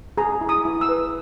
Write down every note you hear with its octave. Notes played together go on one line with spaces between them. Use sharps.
G#4 A#5
E4
D#6
E4
E6
B4